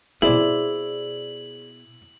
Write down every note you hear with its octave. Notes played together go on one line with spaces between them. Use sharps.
B2 B3 E4 G#4 C5 D5 F#7